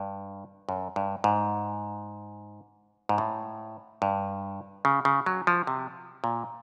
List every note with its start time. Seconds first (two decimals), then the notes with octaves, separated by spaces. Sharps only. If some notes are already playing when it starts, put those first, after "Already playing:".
Already playing: G2
0.69 F#2
0.96 G2
1.24 G#2
3.09 G#2
3.18 A2
4.02 G2
4.85 C#3
5.05 C#3
5.26 F#3
5.47 F3
5.67 C3
6.24 A#2